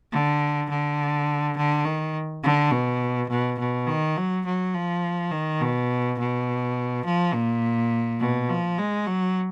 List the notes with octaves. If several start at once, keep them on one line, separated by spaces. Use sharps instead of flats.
D3
D3
D3
D#3
D3
B2
B2
B2
D#3
F#3
F#3
F3
D#3
B2
B2
F3
A#2
B2
F3
G#3
F#3